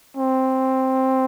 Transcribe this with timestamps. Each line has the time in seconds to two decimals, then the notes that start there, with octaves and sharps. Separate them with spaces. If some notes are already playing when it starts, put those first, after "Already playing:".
0.17 C4